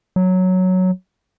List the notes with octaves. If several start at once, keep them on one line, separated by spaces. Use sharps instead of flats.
F#3